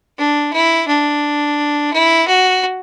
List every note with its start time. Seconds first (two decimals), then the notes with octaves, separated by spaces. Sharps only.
0.18 D4
0.53 E4
0.88 D4
1.93 E4
2.28 F#4